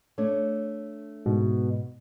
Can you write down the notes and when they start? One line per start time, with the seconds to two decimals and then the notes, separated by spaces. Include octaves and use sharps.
0.18 A3 D4 C#5
1.26 G#2 B2